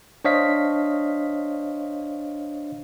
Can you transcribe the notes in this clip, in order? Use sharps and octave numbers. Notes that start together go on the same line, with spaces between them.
D4 C5 C#5 D#5 F5 B6